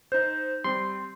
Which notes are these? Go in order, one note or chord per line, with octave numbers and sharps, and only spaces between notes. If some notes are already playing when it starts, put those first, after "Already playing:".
D#4 C5 G6
G3 C4 C6